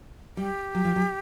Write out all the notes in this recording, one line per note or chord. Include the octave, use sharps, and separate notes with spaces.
G3 G4
F#3
F3
F#3